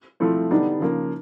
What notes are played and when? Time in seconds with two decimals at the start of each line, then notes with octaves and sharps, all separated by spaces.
0.20 F3 A3 C4 E4
0.51 D3 G3 B3 D4 D#4
0.80 C#3 F3 A#3